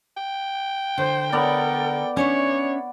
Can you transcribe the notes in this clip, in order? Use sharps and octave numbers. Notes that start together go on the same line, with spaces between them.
G5
D3 C5
B3 A4 A#4 D5
C#4 D4 C#5 E5